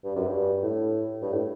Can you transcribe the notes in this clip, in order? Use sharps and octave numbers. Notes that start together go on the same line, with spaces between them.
G2
F#2
G2
A2
G2
A2